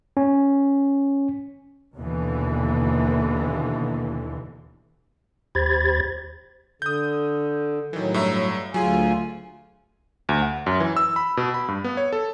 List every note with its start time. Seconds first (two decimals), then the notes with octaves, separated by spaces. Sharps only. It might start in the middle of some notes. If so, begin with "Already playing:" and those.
0.17 C#4
1.95 D#2 B2 D3 E3
5.55 D#2 G4 C5 B5 G#6 A6
6.82 D3 D#6 G6
7.93 A2 D#3 E3 F#3
8.14 G2 E5 A#5
8.74 D2 F#3 F4 G#4 G#5
10.29 D2
10.42 F#5
10.66 F#2
10.80 E3
10.97 E6
11.16 B5
11.37 B2
11.54 B5
11.68 G2
11.84 B3
11.97 C#5
12.13 A4